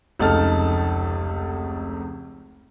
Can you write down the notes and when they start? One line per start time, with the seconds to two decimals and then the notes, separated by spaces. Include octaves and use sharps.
0.19 F1 C#2 D#4 A4 A5 F6